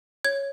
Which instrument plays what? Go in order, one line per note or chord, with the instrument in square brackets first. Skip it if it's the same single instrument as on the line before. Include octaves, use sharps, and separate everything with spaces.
[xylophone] C#5 G#6